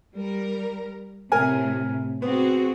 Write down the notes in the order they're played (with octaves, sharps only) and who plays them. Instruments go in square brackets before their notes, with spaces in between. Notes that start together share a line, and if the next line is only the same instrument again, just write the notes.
[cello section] G3 A#4
[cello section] A2 C3 [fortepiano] A#4 G#5
[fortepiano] B3 [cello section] C4 F#4 G#4